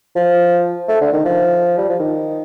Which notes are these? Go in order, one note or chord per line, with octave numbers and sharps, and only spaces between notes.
F3
A3
D3
D#3
F3
G3
F3
D#3